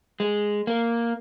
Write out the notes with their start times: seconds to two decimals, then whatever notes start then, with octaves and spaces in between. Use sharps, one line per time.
0.20 G#3
0.67 A#3